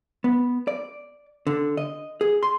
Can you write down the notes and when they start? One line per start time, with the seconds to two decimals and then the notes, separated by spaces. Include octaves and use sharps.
0.24 B3
0.68 D5
1.47 D3
1.77 D#5
2.21 G#4
2.43 C6